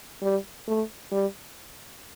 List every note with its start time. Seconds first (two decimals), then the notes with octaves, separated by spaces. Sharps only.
0.22 G3
0.68 A3
1.12 G3